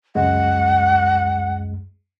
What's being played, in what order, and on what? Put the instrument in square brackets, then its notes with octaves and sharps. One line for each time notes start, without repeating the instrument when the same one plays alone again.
[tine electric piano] C#2 F#2 G#3 [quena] F#5